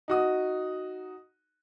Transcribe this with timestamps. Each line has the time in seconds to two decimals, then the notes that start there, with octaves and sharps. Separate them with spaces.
0.08 D#4 F#4 D#6